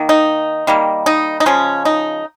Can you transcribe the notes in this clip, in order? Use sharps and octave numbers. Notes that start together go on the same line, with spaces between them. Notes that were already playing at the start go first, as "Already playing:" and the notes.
Already playing: D#3 A#3
D#4
D#3 G3 A#3
D#4
D#4
C#3 F3 G#3 C#4
D#4